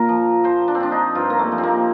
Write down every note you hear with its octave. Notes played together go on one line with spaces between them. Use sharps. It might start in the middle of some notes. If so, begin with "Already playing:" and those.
Already playing: A#2 A#4
F3
F3 C5
D4
C4
F3 D4
D#4
G2 F4
A#3
A3
F3
C4
A#3